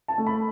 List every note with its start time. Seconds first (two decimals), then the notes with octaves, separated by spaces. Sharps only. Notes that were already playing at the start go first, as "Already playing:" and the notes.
0.08 A5
0.18 A3
0.27 B5